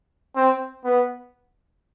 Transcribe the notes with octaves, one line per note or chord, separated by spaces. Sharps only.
C4
B3